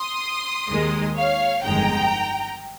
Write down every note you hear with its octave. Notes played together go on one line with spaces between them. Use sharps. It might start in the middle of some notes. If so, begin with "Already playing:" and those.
Already playing: C6 D#6
D#2 D#3 G#3
C#5 F5
G1 F2 D#3 G#3 G5 A#5